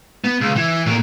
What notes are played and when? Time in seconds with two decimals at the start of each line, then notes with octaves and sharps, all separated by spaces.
0.24 B3
0.41 C#2
0.56 E3
0.86 A2 A#3